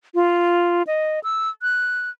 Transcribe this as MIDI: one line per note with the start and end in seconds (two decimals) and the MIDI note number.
0.15 0.83 65
0.87 1.20 75
1.24 1.49 88
1.62 2.10 90